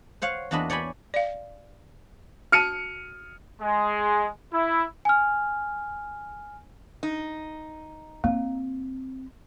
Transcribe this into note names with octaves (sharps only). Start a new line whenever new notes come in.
C5 C#5 F5 F#5
E2 A#3 D4 F#4 D#5 B5
C#5 D5 G5 G#5 B5
D5 F5
F#4 A5 F6 C#7 D#7
G#3
E4
G#5 F6
D#4
A#3 C4